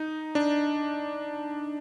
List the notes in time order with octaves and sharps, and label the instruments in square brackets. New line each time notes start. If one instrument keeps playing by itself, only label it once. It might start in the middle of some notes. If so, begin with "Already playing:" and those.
Already playing: [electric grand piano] D#4
D4